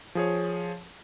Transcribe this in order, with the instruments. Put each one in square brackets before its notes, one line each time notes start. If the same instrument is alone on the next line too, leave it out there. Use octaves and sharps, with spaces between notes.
[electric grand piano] F3 G#4 C#5